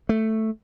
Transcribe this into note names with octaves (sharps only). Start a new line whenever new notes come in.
A3